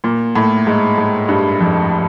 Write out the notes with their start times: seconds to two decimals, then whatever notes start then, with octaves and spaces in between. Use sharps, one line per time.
0.04 A#2
0.35 A2
0.67 G#2
0.98 G#2
1.29 G2
1.60 F2